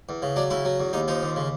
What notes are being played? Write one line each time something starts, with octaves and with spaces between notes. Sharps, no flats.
E2
C#3
F#3 D4
C#3 E4
F#3
E2
D#2 D#4
F3 D#4
D#2
C#3